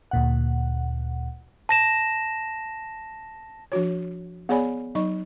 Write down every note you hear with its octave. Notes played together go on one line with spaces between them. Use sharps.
D2 A#2 F#5
A5 A#6 E7
F3 D4 F#4 C#5
B3 G#4 C#5 D5 G#5 B5
F#3 D#4 D#5 C#6